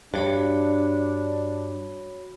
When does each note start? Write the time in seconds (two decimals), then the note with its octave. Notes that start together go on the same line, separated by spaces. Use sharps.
0.14 G2 D4 F#4 C#5 B5